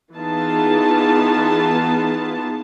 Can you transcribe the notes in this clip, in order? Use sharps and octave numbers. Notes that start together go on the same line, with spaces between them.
E3 B3 D#4 F4 G#4 A5